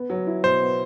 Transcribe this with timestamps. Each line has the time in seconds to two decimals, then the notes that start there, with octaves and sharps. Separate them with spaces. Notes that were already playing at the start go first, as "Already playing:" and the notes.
Already playing: B3
0.10 F#3
0.27 E4
0.44 B2 C5
0.61 B3